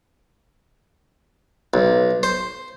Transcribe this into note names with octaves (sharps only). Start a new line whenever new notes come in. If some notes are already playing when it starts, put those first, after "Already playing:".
B1
C5